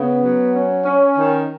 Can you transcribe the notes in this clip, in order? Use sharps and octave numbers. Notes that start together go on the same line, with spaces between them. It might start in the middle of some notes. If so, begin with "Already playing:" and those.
Already playing: C#3 B3
F#3
C#4
C#4
D#3